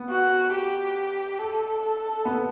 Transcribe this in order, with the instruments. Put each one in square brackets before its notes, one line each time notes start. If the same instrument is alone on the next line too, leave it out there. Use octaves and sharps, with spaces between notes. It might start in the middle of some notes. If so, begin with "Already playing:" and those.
Already playing: [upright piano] B3
[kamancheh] F#4
G4
A4
A4
[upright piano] B3